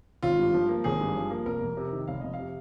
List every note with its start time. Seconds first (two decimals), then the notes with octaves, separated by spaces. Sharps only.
0.23 G#1 F4
0.38 G2
0.54 F3
0.69 A#3
0.84 G#1 G#4
1.01 G2
1.16 F3
1.30 A#3
1.46 F1 A#4
1.61 F2
1.77 C3
1.92 D#3
2.08 F1 F5
2.21 F2 D#5
2.34 F5
2.39 C3